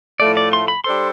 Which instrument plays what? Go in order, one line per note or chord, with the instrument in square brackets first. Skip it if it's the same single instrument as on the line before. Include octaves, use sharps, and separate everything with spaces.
[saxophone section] A2 F3 A3 [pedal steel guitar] D5
[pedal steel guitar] D5
C6
B5
[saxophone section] G3 D4 A4 C5 [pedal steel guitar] C6